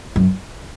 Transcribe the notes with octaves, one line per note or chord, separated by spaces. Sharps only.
F#2